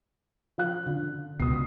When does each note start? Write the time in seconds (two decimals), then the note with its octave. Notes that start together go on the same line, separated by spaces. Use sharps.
0.58 F3 F5 F#6
0.86 D3
1.40 C#2 B2 D#6 C7